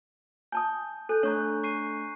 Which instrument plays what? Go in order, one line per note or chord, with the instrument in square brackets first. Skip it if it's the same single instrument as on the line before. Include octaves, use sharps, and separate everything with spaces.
[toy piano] G#5 A5 D#6 [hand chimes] G6
[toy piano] A4 [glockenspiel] G#5 G6 [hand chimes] F#6
[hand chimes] A3 D4 [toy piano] C#5 [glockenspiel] A#5 C#6 F#6
[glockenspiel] C#6 C7 D#7